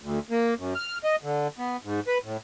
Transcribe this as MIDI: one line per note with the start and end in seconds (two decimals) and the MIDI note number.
0.02 0.19 38
0.30 0.54 58
0.58 0.74 42
0.75 0.98 89
1.04 1.16 75
1.23 1.48 50
1.58 1.77 59
1.84 2.00 44
2.07 2.18 71
2.24 2.37 45